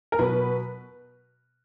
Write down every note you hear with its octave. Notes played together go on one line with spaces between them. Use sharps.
A#4
B2 F#3 B4